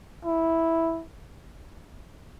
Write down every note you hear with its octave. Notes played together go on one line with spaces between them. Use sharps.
E4